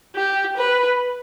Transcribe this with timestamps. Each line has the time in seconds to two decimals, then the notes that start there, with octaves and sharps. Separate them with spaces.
0.16 G4
0.57 B4